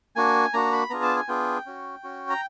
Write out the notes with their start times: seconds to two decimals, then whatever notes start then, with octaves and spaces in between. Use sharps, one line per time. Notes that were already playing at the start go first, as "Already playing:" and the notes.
0.16 A#3 D4 F#4 G#5
0.54 A#3 D4 F#4 A#5
0.73 B5
0.90 B3 D4 F4 G#4 A#5
1.03 A5
1.16 G#5
1.28 B3 D4 F4 G#4 G5
1.66 C#4 F#4
2.03 C#4 F#4
2.30 A#5